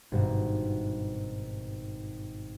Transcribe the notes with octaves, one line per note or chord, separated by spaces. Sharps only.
G#1 G2 B2 F#4